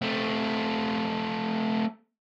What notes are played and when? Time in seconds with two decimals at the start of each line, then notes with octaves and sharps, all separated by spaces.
0.02 A3 C4